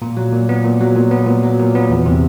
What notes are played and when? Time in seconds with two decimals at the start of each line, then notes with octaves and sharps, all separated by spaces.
0.02 A#2
0.17 F#3
0.32 A#2
0.49 B3
0.64 A#2
0.80 F#3
0.96 A#2
1.11 B3
1.27 A#2
1.43 F#3
1.59 A#2
1.75 B3
1.90 E2
2.06 C3